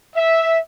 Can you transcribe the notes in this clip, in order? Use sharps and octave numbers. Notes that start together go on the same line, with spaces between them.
E5